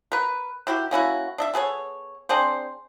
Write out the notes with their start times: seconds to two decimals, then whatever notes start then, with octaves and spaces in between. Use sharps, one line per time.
0.12 A#4 B4
0.67 D#3 E4 F#4 G4
0.91 A#3 C#4 E4 F#4
1.38 D4 D#5 E5
1.54 B3 G#4 A4 C#5
2.29 C4 D4 G#4 C5